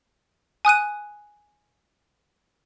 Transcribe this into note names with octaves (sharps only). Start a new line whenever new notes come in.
G#5 D#6 F#6 D#7